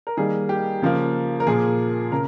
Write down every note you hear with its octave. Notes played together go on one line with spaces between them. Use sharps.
A#4
D#3 G3 A#3 G#4
G4
C#3 F3 A#3
A#4
A#2 F3 A#3 G#4
C#3 A#4